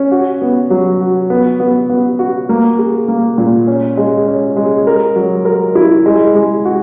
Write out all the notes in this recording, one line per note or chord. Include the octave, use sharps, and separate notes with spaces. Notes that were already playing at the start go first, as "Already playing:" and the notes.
Already playing: C#4
F#4
B3
F#3
F#4
B3
B3
B3
F#4
A#3
G#4
A#3
A#2
C#4
G#3
C#4
G#3
A#4
F#3
A#4
E4
G#3
G#3
F#4